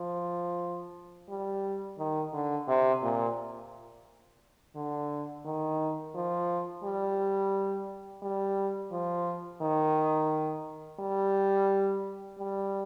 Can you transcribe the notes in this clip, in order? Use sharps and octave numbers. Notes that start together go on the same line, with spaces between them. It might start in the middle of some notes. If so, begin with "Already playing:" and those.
Already playing: F3
G3
D#3
D3
C3
A#2
D3
D#3
F3
G3
G3
F3
D#3
G3
G3